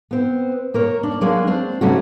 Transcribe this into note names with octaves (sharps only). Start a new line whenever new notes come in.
B3 C4
A#3 A#4 C#5
D4
F#3 G#3 A#3 D4
C4 D4
C#3 F#3 G3 A3 C#4 F#4